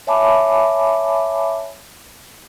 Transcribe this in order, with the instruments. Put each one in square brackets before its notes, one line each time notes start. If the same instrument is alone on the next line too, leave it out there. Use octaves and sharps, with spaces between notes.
[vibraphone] C#5 E5 G#5 A5 B5 D6